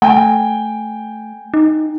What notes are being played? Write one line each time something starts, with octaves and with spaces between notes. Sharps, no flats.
A3 G5 G#5
D#4